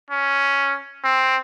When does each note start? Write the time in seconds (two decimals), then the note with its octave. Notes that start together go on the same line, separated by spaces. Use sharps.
0.11 C#4
1.04 C4